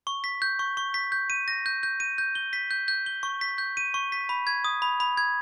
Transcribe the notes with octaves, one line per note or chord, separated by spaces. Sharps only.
C#6
B6
G6
C#6
C#6
B6
G6
D#7
A#6
G6
G6
D#7
G6
G7
B6
G6
G6
G7
C#6
B6
G6
D#7
C#6
B6
B5
G#6
D#6
B5
B5
G#6